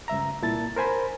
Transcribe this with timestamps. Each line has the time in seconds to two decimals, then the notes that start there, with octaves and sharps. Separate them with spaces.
0.08 C#2 G2 E5 A#5
0.42 C2 A#2 E4 A5 A6
0.76 A#4 C5 G#5 B5